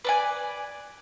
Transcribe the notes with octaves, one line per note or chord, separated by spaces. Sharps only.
B4 D5 G#5